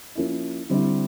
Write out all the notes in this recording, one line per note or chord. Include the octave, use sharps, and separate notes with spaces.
F3 A#3 C#4 E4
D3 G3 C4 E4